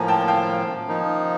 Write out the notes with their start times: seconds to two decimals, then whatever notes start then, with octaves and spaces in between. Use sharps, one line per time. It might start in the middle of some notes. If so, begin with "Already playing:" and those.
Already playing: A2 F3 A#3 G#5 A#5
0.08 G5 A5
0.28 F5 G5
0.88 F3 A#3 D#4